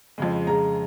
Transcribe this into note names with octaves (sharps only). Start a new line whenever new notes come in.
F2 C#3 G#3
F2 C#3 G#3 A#5